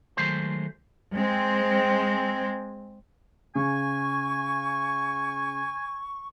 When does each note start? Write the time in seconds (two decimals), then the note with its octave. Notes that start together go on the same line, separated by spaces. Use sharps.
0.17 D#3 F#3 G#3 A3 C5 C6
1.16 G#3 C4
3.55 C#3 G#5 C#6